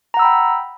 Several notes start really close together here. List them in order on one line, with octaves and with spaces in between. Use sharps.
A#5 F#5 E6 B5 G5